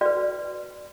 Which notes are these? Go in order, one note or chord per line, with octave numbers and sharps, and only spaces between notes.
F#4 B4 D5